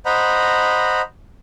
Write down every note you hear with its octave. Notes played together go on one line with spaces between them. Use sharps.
C5 D#5 F#5 A#5 B5